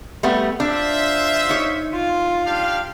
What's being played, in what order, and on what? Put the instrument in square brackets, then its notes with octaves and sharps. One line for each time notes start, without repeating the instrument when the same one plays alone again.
[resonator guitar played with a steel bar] G3 A3 B3
[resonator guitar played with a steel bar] D4 [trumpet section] F4 C5 E5
[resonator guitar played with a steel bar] D#4 C#5
[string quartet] F4
[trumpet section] D4 G4 F5